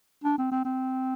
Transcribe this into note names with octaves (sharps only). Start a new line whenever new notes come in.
D4
C4
C4
C4